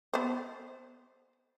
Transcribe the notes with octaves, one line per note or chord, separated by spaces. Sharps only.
B3 C5